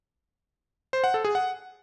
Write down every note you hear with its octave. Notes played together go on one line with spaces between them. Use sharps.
C5
F#5
A4
G#4
F#5